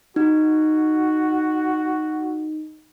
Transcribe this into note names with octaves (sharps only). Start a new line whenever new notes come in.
D#4 F#4